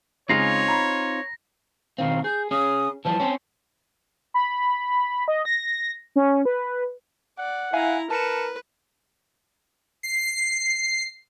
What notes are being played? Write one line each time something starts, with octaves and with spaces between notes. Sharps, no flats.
C#3 G#3 C4 D#4 F4 C#5 A#6 C7
A#5 B5
B2 D#3 C4 F5
G#4 G6
C#4 G#4 D#6
E3 F3 G3 A5
C4 C#4
B5
D#5
A#6
C#4
B4
D5 F#5
E4 E5 F5 G#5 A#5
A#4 B4 A5 C#7 E7
C7